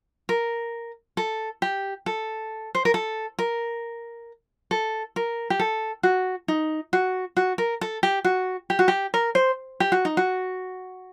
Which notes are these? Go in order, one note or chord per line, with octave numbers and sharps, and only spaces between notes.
A#4
A4
G4
A4
C5
A#4
A4
A#4
A4
A#4
G4
A4
F#4
D#4
F#4
F#4
A#4
A4
G4
F#4
G4
F#4
G4
A#4
C5
G4
F#4
D#4
F#4